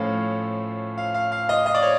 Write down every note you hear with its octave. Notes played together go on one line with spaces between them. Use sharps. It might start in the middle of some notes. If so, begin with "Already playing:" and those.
Already playing: A2 F3 A3 C#4 F4 F5
F5
F5
F5
D#5
D#5
D5
C#5